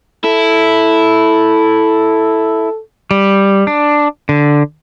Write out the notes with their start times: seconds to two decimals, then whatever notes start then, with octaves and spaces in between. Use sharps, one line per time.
0.24 E4 A4
3.11 G3
3.67 D4
4.29 D3